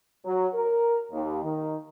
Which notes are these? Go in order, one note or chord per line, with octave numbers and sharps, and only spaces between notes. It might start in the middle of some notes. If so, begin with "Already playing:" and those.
F#3
A#4
D#2
D#3